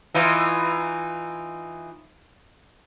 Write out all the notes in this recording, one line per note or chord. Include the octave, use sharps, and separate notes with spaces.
E3 D#4 F4